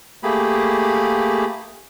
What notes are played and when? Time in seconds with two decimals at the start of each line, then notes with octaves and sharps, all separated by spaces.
0.23 A3 A#3 G4 G#4 B5